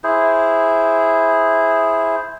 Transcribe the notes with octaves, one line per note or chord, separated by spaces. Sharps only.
E4 G#4 C5